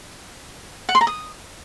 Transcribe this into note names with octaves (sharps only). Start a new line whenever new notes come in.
F#5
C6
A#5
D#6